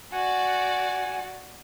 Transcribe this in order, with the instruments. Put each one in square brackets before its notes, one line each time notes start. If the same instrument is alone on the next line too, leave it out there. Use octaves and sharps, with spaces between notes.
[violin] F#4 D5 [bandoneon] F#5 G#5